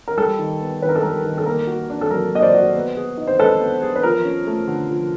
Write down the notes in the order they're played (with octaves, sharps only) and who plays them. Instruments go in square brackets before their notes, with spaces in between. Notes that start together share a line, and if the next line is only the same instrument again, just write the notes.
[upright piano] A#4
[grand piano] G3 [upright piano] A4
[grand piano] D#3
B3
[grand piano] D#3 [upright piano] B4
[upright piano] A#4
A4
[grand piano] G3 [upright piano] A#4
[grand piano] D#3
[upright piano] A4
[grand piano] A#3 [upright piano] A#4
[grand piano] F#4
D4
[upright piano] A4
[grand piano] F#3 [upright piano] A#4
[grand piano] A#3 [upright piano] D#5
[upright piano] C5 D5
[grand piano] F#4
B3
G#4
D#4
[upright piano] C5
[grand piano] G#3 [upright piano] A4 B4
[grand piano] B3
G#4
[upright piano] B4
[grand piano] F3 [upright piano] A#4
[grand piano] C#4
A3
D3
F3